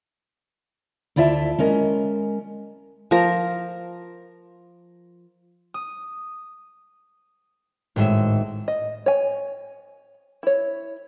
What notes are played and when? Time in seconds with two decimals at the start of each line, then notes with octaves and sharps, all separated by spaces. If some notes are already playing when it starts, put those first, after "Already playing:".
1.16 D2 E4 F4 D5 E5 A5
1.58 G#3 C#4 A#4 D#5
3.11 F3 A#4
5.74 D#6
7.96 G#1 A2 G#3 E5 E7
8.68 D#5
9.06 C#5 G#5
10.43 E4 C#5